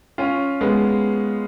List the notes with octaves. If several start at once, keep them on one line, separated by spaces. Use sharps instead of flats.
C#4 F4
G#3 B3